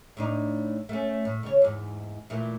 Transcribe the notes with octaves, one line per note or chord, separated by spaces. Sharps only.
A2 D4 D#4
A3 C#4
A2
C#3 C#5
E2 G#2
A#2 E3 A3